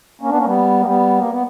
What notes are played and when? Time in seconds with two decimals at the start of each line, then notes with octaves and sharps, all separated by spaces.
0.21 A#3 C#4
0.29 B3 D4
0.37 A#3 C#4
0.45 G3 B3
0.81 A#3
0.85 G3 B3
1.18 A#3
1.30 B3